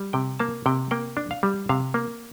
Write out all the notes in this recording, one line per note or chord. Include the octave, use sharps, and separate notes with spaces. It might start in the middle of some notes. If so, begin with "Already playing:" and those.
Already playing: G3
C3 G5
A#3 A5
C3 G5
A#3 G5
D4
F5
G3
C3 F5
A#3